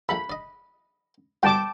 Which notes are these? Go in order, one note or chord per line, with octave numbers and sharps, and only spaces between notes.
A#1 A4 E5 B5
D5 D#5
G2 B2 D3 G5 A5 D6